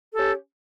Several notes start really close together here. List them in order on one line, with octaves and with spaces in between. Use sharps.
A4 G4 C#4